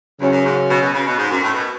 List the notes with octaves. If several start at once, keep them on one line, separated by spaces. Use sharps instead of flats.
E2 C#3 F#3 C#4
F#2
G#2
B2
B2
C#3
B2
G#2
F#2
A2
B2